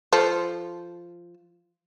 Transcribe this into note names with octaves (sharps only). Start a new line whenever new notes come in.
F3 A4